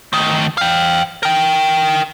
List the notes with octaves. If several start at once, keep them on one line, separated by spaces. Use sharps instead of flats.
D#3 A3
F5 G5
A#4 G5